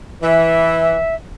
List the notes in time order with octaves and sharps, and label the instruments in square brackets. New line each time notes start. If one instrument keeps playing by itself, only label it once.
[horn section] E3 [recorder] E5